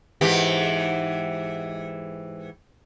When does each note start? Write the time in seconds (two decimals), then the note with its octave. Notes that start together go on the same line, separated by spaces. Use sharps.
0.21 G#2 E3 G4